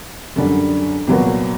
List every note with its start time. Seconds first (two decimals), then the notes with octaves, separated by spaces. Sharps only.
0.36 F#2 D3 G3
1.07 C2 A#2 F#3 B3